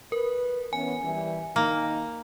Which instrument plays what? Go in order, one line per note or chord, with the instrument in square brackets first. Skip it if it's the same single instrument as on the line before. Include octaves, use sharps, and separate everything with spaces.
[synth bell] A#4 [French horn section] B4
[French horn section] E3 B3 C#4 [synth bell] G#5
[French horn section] E3 G3
[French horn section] D#3 D#4 [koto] A#3